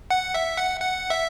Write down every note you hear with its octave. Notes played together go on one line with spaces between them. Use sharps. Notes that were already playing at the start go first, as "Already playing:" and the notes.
F#5
E5
F#5
F#5
E5